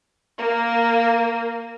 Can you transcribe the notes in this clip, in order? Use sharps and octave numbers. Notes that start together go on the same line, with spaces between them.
A#3